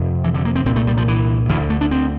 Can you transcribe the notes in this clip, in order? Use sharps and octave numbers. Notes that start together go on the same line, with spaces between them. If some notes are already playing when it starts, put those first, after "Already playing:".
Already playing: F2 C3
E3
D3
A#3
C4
C2 A#2 C4
A3
G3
F3
E3
D2 D3 E3
A3
D4
C4